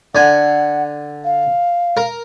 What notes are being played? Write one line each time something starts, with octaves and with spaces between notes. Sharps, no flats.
D3 F#5 G#5
F5
A#4